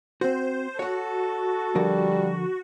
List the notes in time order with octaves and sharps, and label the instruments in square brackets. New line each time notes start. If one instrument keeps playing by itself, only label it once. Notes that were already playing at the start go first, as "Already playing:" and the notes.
[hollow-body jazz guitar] C4 F#4 [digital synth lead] C5
[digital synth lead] F#4 [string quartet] A4 [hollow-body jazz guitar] C#5 F#5
[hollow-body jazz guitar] D3 F3 A#4 [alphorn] G3